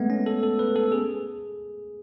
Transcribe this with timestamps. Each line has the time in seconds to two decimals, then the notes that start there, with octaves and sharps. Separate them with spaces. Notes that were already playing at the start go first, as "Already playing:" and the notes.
Already playing: G#3 A3 B3
0.10 C#4
0.26 A4
0.43 A4
0.59 B4
0.76 A4
0.92 G#4